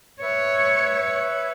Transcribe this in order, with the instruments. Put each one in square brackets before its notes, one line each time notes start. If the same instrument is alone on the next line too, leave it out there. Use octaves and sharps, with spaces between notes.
[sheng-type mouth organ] B4 E5 [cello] C#5